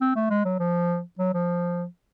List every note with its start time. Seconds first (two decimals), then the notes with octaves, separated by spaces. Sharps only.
0.01 C4
0.16 A3
0.30 G#3
0.45 F#3
0.60 F3
1.19 F#3
1.34 F3